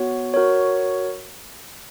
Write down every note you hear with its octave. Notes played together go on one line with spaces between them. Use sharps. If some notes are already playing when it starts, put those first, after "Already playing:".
Already playing: B3 F#4 C#5
F#4 A#4 C#5